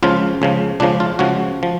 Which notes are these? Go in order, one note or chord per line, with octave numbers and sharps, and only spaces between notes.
C#2 C#3 F3 F4
C#2 C#3 F3
C#2 C#3 F3 D4
F4
C#2 C#3 F3 F#4
F3